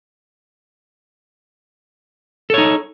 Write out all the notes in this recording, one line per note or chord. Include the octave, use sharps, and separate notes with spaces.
D#4 A4 C#5